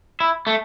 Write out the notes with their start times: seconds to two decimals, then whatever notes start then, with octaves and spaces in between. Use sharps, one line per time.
0.20 E4
0.47 A3